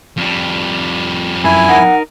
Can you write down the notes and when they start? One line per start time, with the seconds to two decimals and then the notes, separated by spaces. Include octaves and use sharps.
0.17 F2 G3
1.44 F#2 E4 G#5
1.69 D#4 A#4 F#5